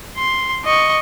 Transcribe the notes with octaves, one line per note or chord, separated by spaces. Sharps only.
C6
D#5 C#6